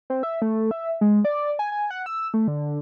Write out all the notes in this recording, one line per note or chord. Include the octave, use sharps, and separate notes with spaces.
C4
E5
A3
E5
G#3
D5
G#5
G#5
F#5
E6
A3
D3